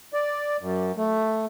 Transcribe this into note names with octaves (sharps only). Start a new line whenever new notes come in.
D5
F#2
A3